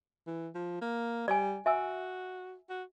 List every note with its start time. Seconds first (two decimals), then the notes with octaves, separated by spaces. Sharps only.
0.27 E3
0.55 F3
0.81 A#3
1.28 G3 D5 G#5
1.66 F#4 E5 G#5 E6
2.69 F#4